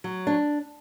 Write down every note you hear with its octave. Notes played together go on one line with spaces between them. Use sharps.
F#3
D4